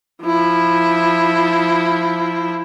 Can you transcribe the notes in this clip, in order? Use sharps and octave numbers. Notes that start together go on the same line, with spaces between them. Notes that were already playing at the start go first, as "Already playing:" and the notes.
F3 E4